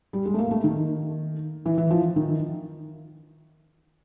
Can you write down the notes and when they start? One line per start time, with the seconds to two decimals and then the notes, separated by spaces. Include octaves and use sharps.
0.13 G3
0.25 G#3
0.34 A3
0.38 A#3
0.51 A3
0.64 D#3
1.66 E3
1.78 E3
1.91 F3
2.16 D#3